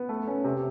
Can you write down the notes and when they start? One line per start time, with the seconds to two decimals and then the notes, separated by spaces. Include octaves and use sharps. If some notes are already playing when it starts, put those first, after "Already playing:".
Already playing: B3
0.09 A3
0.27 C#4
0.44 C3